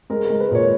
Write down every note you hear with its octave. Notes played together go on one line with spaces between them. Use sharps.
G#3 A#4
G#3 A#4
B4
A#2 C#5